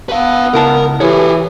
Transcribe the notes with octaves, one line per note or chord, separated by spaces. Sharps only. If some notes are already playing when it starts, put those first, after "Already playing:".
B3 B4 F5
C#2 E4 A#4 A5
E3 G4 G#4 C#5